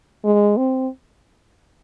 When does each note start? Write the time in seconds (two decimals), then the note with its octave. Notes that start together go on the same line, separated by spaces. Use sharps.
0.24 G#3
0.57 C4